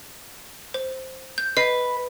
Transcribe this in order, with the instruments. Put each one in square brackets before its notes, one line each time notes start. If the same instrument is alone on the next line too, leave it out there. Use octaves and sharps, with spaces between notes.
[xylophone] C5
G6
[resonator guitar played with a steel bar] B4 [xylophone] D#5 C7